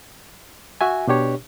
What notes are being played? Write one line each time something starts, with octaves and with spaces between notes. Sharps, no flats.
F#4 E5 G#5
B2 D4 G4 C#5